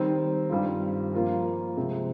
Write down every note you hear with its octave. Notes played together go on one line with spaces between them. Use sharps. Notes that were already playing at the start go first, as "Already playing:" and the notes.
Already playing: D#3 G3 C4
G2 D#3 G3 C4 F4
F3 A#3 F4 A#4
C3 F3 G#3 C4